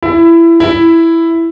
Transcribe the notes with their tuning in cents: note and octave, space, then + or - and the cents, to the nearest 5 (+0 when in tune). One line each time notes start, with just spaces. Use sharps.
E4 +20
E4 +5